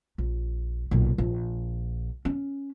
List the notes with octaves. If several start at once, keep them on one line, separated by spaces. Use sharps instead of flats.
A#1
B1 A#2
A#1
C#4